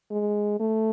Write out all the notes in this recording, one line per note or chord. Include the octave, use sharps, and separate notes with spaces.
G#3
A3